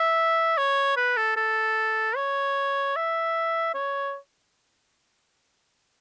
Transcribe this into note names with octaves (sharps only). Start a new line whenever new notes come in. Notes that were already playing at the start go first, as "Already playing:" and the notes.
Already playing: E5
C#5
B4
A4
A4
C#5
E5
C#5